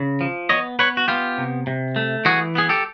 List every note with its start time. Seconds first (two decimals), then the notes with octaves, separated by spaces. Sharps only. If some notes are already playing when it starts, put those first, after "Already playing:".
Already playing: C#3
0.21 F3
0.49 B3 C#5 D#5
0.79 B3 B4 C#5
0.97 F#4
1.08 B3 F4 G4
1.38 C3
1.67 C3
1.96 A3
2.25 E3 F#4 G#4
2.55 B3 G#4
2.69 G4 A4